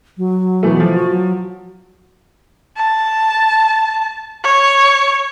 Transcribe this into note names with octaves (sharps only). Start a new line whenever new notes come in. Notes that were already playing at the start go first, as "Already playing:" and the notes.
F#3
B2 E3 A3
F3
F#4
F#3
A5
C#5